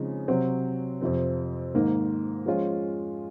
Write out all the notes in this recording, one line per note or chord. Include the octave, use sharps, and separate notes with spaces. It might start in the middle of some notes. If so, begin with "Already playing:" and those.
Already playing: C#3 F3 G#3 C4 D#4
C3 F#3 C4 F#4
F2 C3 F3 C4
G#2 D#3 A#3
F3 G#3 C#4 F4